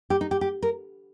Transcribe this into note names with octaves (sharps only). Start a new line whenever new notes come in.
G4
D#4
G4
G4
A#4